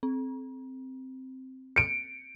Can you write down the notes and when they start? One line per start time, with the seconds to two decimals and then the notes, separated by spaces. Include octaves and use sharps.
0.03 C4
1.76 C#7 D7